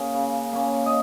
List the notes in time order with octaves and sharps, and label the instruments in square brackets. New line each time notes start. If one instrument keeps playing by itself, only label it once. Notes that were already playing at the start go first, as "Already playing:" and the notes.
Already playing: [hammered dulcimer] A#3 C#4 G#4
C#3
A#3 C#4
D#5